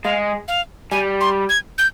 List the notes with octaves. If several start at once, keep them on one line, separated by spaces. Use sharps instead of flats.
G#3 F5
F5
G3 G#5
C6
G#6
G6